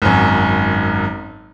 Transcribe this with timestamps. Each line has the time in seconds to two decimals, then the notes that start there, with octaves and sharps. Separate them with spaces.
0.02 G#1 F#2